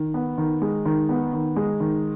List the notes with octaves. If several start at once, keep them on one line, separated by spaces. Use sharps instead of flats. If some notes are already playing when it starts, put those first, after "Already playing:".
Already playing: D#3
B3
D#3
G#3
D#3
B3
D#3
G#3
D#3